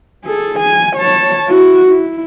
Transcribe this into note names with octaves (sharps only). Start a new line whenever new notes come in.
G#4 A4
G#5
C#5 A5
E4 F#4
E4